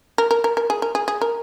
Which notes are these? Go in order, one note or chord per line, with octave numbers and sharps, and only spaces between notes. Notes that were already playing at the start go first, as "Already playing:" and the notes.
A#4
A#4
A#4
A#4
G#4
A#4
G#4
G#4
A#4